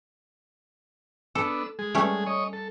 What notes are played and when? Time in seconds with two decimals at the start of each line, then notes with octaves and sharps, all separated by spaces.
1.35 B3 D4 A4 E6
1.79 G#3 G#4
1.95 G3 A3 C#4
2.26 C#5 D#5
2.53 A4